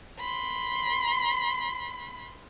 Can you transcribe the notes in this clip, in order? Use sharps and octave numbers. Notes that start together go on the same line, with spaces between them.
B5 C6